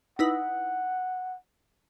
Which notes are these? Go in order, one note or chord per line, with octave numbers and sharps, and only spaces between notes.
D#4 E4 B4 F#5